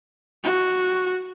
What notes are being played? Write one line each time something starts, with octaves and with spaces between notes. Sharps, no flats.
F#4